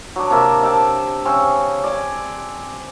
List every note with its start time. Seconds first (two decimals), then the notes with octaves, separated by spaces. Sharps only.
0.16 F#3 D4
0.30 C3 A#3 E5
0.63 E5 G5 A5
1.25 C#3 C4 C#4
1.84 D5 G#5